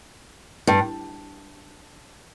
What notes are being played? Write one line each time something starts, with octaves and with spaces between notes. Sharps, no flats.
G2